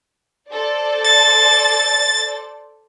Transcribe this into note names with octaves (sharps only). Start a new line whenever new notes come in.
A4 C5 D5
A6